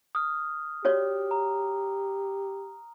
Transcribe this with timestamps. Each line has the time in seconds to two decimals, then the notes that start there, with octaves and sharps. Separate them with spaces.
0.15 D#6 F6
0.85 F#4 G4 C#5 D5
1.31 A#5